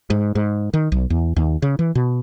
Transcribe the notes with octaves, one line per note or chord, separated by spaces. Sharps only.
G#2
G#2
D#3
B1
E2
D#2
C#3
E3
B2